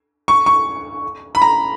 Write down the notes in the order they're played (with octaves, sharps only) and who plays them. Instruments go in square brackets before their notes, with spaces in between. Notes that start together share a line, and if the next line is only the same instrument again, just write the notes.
[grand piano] C#6
C#6
B5
A#5